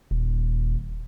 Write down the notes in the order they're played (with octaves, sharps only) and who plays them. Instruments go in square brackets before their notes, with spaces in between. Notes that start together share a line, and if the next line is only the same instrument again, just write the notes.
[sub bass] D#1